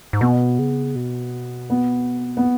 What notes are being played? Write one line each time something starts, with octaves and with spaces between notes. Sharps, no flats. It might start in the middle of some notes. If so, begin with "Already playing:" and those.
G#2
B2 B3
C#3
B2
B3
B3